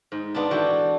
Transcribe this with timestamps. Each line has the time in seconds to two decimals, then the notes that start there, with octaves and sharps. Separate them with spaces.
0.12 G#2
0.34 B3 D4 F4 A5
0.51 E3 F#4 A4 G5